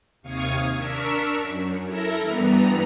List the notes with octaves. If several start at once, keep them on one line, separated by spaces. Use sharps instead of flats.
D#2 C3 F5 C#6 D#6 G#6
D4 A#4 C#6 E6 B6 C#7
F#2
E4 A4 A#4 E5 A#6
G2 E3 G3 B3 A#5